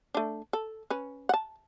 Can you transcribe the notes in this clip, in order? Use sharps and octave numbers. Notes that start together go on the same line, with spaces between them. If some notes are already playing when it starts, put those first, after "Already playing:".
A3 D4
A4
C#4 B4
F#5 A5